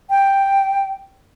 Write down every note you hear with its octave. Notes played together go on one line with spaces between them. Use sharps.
G5